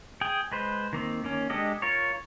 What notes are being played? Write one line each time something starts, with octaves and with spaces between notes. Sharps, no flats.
G#4 G5
G#3 B4 C5
D#3 A#3 C4
D#3 A#3 C#4
G#3 D4 G4 A4 D#5
F4 A#4 C#5